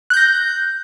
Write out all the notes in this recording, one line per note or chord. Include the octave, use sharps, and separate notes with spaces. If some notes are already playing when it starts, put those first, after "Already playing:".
F#6 G6 A#6